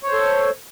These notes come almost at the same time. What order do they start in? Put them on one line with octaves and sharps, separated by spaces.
C#5 C5 A4